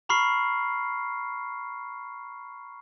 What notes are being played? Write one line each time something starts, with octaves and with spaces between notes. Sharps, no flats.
A#5 B5 C#6 F6 C7